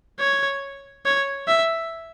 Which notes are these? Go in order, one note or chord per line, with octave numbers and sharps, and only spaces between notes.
C#5
C#5
E5